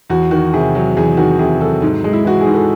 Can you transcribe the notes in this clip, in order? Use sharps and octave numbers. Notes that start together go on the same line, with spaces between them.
E2 F#4
D#3 F#4
C3 G#4
F#3
E2 G#4
D#3 F#4
C3 G#4
F#3 A4
G#2
G#3
E4
E3 F#4
G#4
G#2
A4